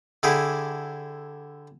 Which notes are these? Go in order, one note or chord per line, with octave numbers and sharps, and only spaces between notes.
D3 E4 G4 G#4